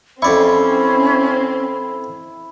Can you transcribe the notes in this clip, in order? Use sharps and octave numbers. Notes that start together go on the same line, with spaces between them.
F2 C4 C#4 E4 D5 C#6